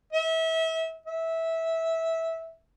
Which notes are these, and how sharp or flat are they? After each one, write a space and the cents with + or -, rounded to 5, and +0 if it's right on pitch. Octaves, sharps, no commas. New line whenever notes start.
E5 -30
E5 -15